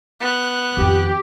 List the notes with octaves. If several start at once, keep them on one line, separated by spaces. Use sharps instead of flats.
B3 F#6
F2 D#3 G4